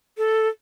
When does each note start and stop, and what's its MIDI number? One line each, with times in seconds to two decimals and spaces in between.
0.18 0.48 69